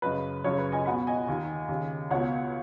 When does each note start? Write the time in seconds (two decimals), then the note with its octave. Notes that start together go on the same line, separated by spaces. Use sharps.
0.02 F#2 C#3 B4 D#5
0.44 F#2 C#3 C#5
0.58 B4
0.72 D#5 G#5
0.85 C#2 B2 F#5 B5
1.07 D#5 G#5
1.28 D#2 D#3
1.69 D#2 C#3
2.10 C#2 B2 C#5 F#5